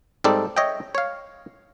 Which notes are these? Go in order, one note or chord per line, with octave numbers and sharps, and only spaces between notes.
G#2 G3 C4 D#4 A4 D5
C#5 D#5 E5 G5
C#5 F5